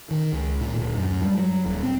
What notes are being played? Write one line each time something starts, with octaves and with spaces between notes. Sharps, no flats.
D#3
C#2
A#2
D1
F#2
G3
F#3
D#1
C4